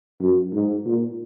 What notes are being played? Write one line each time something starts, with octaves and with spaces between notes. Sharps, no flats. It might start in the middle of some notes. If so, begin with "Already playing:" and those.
F#2
G#2
A#2